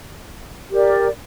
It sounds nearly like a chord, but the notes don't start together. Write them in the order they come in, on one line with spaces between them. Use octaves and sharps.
G4 A#4 D5